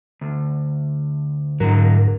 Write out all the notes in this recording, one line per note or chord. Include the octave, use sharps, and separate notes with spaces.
D2
G#2 D3 F#3 A#4